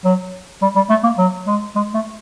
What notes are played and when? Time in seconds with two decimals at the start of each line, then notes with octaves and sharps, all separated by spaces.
0.05 F#3
0.62 G3
0.76 G3
0.90 A3
1.03 A#3
1.18 F#3
1.47 G#3
1.75 G#3
1.94 A3